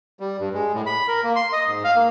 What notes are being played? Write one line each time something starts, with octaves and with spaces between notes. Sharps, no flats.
G3
G2
G#3
A2
B5
A#4
A#3
C6
D#5
G#2
F5
A#3